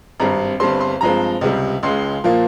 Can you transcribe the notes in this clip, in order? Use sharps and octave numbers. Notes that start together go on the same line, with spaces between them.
G#1 G2 G3 C4 A#5
G1 G2 G3 C4 C6
C6
G2 F3 G#3 C4 A#5
C#2 C3 G3
C#2 C#3 G#3 C6
A#2 F3 A#3